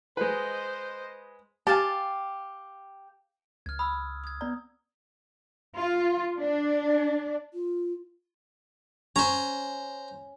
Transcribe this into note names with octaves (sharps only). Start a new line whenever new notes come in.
G#3 B4 C5 D#5
G4 F5 G#5 A5
C#2 F6 G#6
B5 D#6 E6
D#6 G#6
B3 D5 A#5
F4
D4
F4
C#4 C5 A#5